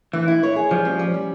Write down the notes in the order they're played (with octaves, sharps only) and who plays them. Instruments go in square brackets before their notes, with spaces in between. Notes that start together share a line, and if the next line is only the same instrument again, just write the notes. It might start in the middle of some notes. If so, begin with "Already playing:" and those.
[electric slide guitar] E3 [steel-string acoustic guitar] E4
[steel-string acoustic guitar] E4
C#5
G#4
[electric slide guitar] F3 [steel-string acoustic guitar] G3
[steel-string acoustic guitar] C#4
G3
C#4